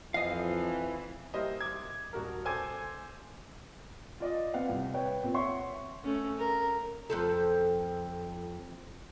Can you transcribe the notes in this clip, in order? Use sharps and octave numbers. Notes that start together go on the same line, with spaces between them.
F2 E3 F3 D#5 F5
G3 A#3 E4 C5 D#5
D6 G#6
D#1 F#4 A#4
A4 C5 G#5 A5 D6 G#6
F4 D5 D#5
C4 B4 F5 F#5
C2
B4 C#5 G5
A#2 C4
C#5 E5 F#5 C6 C#6
A3 C#4
A#4
F2 F3 A4